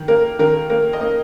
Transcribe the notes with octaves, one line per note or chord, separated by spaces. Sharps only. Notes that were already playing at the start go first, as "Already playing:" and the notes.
Already playing: D#3
A#3 A#4
D#3 A#4
A#3 A#4
D#5
A#3